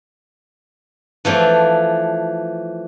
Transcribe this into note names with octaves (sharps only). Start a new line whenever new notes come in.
E3 F3 A3 D4